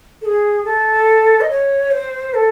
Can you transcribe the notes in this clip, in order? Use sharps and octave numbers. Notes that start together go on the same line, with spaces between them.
A4
G#4
A4
D#5
C#5
C5
A4